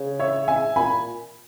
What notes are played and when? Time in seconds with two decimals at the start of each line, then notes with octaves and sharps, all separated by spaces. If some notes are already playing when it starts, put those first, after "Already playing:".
Already playing: C#3
0.19 C#5 E5
0.48 E5 G#5
0.76 A#2 G#5 B5